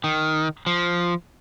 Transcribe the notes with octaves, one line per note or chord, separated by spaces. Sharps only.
D#3
F3